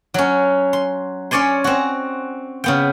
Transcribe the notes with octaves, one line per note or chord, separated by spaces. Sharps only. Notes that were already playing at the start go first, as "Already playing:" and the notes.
F#3 C#4
C6
C#4 C#5 D5 G#5 C6
C4 F#4
C#3 B3 G5